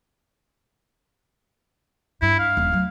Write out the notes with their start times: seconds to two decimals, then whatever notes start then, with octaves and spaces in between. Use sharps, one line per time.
2.22 G2 E4
2.39 F5
2.57 D#1 A#1
2.72 F#3 A3